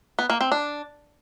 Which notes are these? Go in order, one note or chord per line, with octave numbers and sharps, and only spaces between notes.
B3
A#3
C4
D4